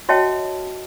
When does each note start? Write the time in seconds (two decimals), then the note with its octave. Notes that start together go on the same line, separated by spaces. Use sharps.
0.09 F#4 C#5 D#5 E5 G5 A5